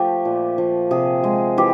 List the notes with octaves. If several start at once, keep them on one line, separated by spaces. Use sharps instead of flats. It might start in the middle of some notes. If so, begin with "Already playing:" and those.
Already playing: F3 A3 G4
A#2
F3
C3 G#4
G#3
E3 G4